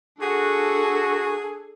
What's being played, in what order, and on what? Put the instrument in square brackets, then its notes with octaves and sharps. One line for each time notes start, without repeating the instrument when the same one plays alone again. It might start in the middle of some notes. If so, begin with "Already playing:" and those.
[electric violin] D4 A4 [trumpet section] F#4 [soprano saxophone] G#4